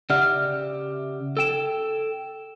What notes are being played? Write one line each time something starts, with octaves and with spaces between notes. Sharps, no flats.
C#3 G4 D5 E5 F#5 F6
A4 G5 E6 E7